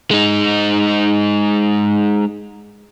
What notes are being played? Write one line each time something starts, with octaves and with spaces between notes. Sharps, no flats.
G#3 D#4